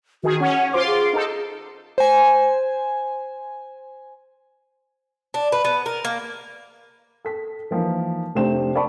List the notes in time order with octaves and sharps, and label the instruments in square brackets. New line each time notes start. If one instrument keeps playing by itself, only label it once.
[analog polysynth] D#3 G#4 [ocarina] F#4
[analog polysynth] C#4 [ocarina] F#5
[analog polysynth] F4 C6 D6 [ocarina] C5
[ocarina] G#4
[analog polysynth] D#4 A4
[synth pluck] C5 G#5
[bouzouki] D4
B4
B3
A#4
A#3
[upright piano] A4 B6
E3 F3 A#3 D#4
F1 C3 A3 D4 C5 E7
C5 D5 A5 B5 C#6